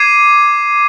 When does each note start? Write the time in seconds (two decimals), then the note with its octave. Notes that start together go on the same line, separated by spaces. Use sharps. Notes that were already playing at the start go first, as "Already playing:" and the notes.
Already playing: D6 G#6 C7 D#7